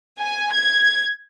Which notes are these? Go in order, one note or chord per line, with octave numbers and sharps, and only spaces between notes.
G#5
G#6